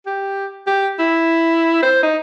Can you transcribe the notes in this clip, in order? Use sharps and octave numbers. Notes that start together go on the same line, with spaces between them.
G4
G4
E4
C5
D#4